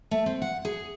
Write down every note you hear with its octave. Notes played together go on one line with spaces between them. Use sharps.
A3
C4
F#5
G#4